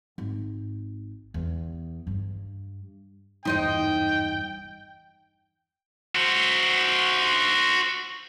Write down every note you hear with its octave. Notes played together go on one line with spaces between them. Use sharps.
G#1
E2
G2
G#1 E2 G2 D#4 C5 D#5 G5
F#4 C5